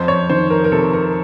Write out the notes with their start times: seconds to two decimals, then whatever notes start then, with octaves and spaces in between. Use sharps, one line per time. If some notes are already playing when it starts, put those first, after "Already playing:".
Already playing: F2 C5
0.08 C#5
0.30 D#3 C5
0.50 A#4
0.64 A#4
0.72 C3 A4
0.93 A#4